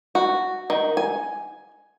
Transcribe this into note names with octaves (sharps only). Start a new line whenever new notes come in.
F#4
D#3
G#5